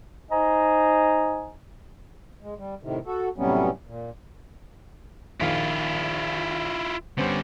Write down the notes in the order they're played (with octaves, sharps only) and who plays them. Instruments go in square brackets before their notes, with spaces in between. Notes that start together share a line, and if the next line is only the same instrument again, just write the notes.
[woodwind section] D#4 C5 D#5 G#5 A#5
[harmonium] G#3
G3
A2 C3 D#3
F#4 A4
A2 C3 F#3 G3 B3 C#4
A#2
[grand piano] A#1 D#3 F5 [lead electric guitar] E4 F4
[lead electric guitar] D3 G3 [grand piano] B3 C#4 C5